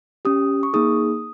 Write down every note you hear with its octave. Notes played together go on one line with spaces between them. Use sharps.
C#4 G4 D#6
C#6
A#3 D#4 G#4 D#6